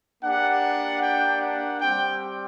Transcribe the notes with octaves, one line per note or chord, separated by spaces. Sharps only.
A#3 D4 G4 F#5
G5
F#5
G3 C4 G4 G5